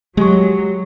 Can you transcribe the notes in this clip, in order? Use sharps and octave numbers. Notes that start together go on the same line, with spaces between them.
F#3 G#3 G4 C#6